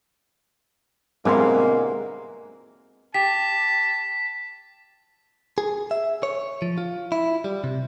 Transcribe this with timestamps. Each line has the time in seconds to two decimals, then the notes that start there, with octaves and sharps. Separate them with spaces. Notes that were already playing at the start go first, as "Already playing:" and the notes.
1.25 G1 G#2 B2 E3 G#3 A#3 C4 C6
3.14 G4 A5 B6
5.58 G#4
5.91 E5
6.23 C#5
6.62 F3
6.78 F4
7.12 E4
7.44 G3
7.64 C3